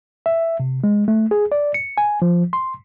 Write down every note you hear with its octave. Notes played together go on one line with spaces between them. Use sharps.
E5
C3
G#3
A3
G#4
D5
C#7
G#5
F3
C6